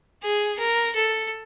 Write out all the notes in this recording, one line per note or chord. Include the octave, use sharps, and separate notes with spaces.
G#4
A#4
A4